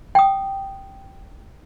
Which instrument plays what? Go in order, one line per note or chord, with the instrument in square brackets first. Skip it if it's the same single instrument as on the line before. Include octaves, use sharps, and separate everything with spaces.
[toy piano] G5 D#6